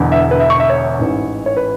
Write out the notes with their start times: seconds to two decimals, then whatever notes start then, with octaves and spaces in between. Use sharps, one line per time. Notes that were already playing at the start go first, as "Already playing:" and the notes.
Already playing: E1 E2 D3
0.12 E5
0.31 B4
0.40 E5
0.50 C#6
0.60 E5
0.70 C#5
0.99 A1 G#2 E3
1.46 C#5
1.57 B4